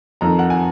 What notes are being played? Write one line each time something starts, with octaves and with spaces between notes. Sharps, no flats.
F2 D#3 A#5
F#5
G#5